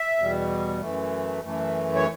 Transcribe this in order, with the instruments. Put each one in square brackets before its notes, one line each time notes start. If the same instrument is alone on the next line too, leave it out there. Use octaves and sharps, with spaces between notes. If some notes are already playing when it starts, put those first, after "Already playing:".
Already playing: [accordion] E5
E2 B2 G3
F#2 E3 A3
F#2 E3 A3
C#5